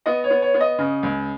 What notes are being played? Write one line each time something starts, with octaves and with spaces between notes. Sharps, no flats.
B3 D#5
C#5
B3
C#5
B3
D#5
C#3
C#2